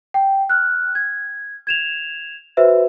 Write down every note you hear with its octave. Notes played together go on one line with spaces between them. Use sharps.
G5
F6 F#6
G#6
G#6 E7 F7
F#4 B4 C5 E5